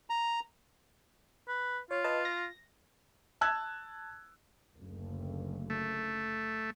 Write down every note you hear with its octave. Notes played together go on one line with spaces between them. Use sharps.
A#5
B4
F4 C#5
B4 D#5 A5
A#6
A5 E6 F#6 G#6
F#1 D2
A3